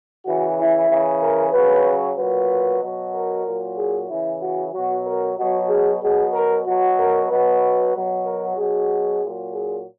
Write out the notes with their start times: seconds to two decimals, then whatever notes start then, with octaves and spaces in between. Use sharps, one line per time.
0.24 C#3 E3 F#4
0.56 E4
0.89 C#3 E3
1.20 A#4
1.52 F#3 B4
1.57 C#3
2.16 A#2 F#3 B4
2.80 B2 F#3
3.12 A#4
3.44 A#2
3.49 F#3
3.76 G#4
4.08 C#3 E3 E4
4.40 F#4
4.72 B2 F#3 F#4
5.05 A#4
5.37 B2 F#3 F#4
5.68 G#4
6.01 B2 F#3 G#4
6.33 A#4
6.65 B2 F#3 F#4
6.97 A#4
7.28 B2 F#3 B4
7.93 B2 F#3
8.26 A#4
8.57 B2 F#3 G#4
9.21 A#2 F#3
9.54 G#4